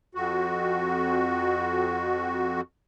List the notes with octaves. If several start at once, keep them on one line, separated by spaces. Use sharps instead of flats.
F2 F#4